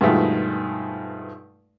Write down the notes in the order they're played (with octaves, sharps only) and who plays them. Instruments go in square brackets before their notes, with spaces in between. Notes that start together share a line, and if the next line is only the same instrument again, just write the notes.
[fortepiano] G2 B2 D#3 F3 G#3 A3